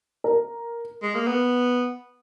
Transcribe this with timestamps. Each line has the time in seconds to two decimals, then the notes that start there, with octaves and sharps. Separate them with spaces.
0.24 A#4
1.02 G#3
1.15 A#3
1.27 B3